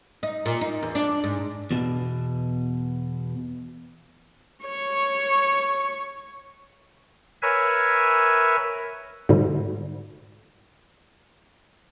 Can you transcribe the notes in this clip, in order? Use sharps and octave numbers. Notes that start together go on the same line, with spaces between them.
D#4
A#2
D#4
E2
D4
G#2
E2 B2
C#5 C#6
A#4 B4 C#5 E5 G#5
G#2 B2 D3 G3